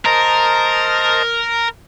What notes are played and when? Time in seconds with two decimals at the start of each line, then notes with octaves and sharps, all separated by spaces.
0.06 A#4 C5 D#5 A5